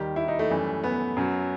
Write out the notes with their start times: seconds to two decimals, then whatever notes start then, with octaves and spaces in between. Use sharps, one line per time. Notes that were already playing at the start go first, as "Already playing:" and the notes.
Already playing: D#2 D#3 G3 G4
0.16 E4
0.28 D#4
0.39 A3
0.50 F#2 E3 G3
0.84 B3
1.17 F#2 F#3